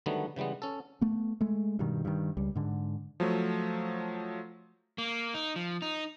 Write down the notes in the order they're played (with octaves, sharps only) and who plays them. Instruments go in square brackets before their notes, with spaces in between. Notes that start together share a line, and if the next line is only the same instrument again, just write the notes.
[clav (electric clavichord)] D3 D#3 F#3 G3 A3 B3
C#3 E3 G3 G#3 B3
C#4 A4
[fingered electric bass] A3 B3
G#3 A3
G2 B2 D#3
G2 D#3
C#2 G3
G#2 D3
[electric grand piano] F3 F#3 A3
[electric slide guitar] A#3
D#4
F3
D#4